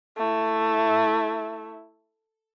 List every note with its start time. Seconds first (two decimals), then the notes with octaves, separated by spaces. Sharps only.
0.18 A3 E4